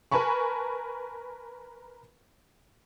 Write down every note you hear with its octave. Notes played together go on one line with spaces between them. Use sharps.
A#4 B4 G#5 A5 B5 C#6